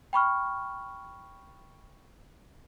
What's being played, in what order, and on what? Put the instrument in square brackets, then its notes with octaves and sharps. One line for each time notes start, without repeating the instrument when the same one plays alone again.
[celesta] G5 B5 C#6 F6